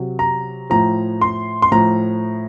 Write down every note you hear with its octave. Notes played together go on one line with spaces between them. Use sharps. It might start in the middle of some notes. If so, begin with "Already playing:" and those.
Already playing: C3 F#3
A#5
A2 F3 A#5
C6
C6
A2 F3 A#5